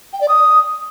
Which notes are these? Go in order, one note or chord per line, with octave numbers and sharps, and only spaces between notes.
G5
D5
D#6